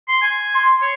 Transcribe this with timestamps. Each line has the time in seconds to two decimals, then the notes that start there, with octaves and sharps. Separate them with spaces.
0.08 C6
0.22 G#5
0.55 C6
0.82 C#5